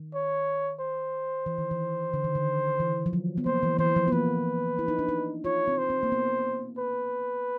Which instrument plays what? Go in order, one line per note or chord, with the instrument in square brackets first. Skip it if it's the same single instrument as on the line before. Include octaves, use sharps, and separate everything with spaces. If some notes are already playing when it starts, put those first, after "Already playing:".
Already playing: [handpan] D#3
[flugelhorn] C#5
C5
[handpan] E3
D#3
E3
D3
D#3
D3
E3
F3
F#3
B3
[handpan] A#3 [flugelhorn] C5
[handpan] E3
[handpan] E3 [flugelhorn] C5
[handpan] F3
B3
[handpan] A#3 [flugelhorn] B4
[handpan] E4
D#4
D4
D#4
[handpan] F4 [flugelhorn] C#5
[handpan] C4
[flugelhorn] C5
[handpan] C4
A#3
B3
[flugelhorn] B4